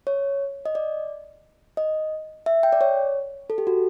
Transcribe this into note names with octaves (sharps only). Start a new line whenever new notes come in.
C#5
D#5
D5
D#5
E5
G5
D5
C#5
A4
G4
F#4